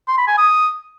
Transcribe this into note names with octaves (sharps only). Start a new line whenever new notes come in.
C6
B5
G#5
D#6